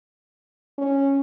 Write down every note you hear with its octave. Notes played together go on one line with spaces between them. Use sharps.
C#4